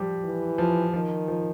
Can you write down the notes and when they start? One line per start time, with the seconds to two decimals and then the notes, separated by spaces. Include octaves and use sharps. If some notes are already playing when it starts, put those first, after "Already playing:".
Already playing: F3 G3
0.24 E3
0.58 F3
0.93 D#3 F3
1.28 F3